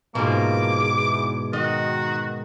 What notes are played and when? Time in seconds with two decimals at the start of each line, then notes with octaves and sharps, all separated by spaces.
0.15 G#2 B2 E3 F3 A#3 D6
0.77 E2
1.53 D#3 F#4 D#5